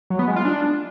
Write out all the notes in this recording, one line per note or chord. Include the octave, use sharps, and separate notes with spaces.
F#3
B3
G#3
F4
D4